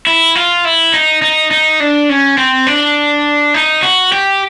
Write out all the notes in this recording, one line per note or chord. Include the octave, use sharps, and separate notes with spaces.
E4
F4
E4
D#4
D#4
D#4
D4
C#4
C4
D4
D#4
F#4
G4